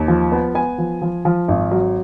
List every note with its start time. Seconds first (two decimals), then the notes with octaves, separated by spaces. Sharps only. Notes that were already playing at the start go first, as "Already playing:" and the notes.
Already playing: D#2
0.08 F3
0.32 B3
0.55 B3 G#5
0.78 F3
1.02 F3
1.25 F3
1.48 G#1
1.71 F#3